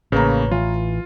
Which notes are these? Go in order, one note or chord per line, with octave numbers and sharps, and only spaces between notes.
A1 C#3 A#3 B4 C#5 A#5
E3 F4